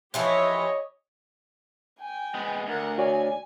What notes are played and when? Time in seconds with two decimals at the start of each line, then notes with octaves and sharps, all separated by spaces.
0.14 E3 F3 E4 G4 C#5 D#5
2.00 G5 G#5
2.34 G#3 B3
2.67 D2 A#4 F#5
2.98 F#4 C#5 D5 G#5